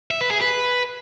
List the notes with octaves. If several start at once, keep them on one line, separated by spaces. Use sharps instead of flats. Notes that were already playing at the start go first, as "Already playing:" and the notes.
E5
B4
G#4
B4